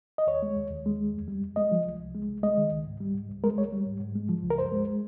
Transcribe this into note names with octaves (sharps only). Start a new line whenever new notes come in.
D#5
D#2 C#5
G#3
D#2
D#2
G#3
D#2
F2
G3
F2
G#3 D#5
F3
C2
C2
G#3
C2
G#3 D#5
D#3
C#2
G#2
G3
G#2
C#2
G#3 A#4
C#2 C#5
G3
G#2
G#2
G#3
F3
C#2
A#4
G2 C5
G#3